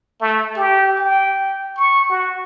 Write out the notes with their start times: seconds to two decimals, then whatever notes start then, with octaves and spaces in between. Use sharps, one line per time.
0.21 A3
0.56 G4
0.99 G5
1.77 C#6
2.10 F#4